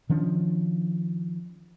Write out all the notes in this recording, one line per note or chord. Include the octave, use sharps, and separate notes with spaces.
D#3 F3 C#4 D4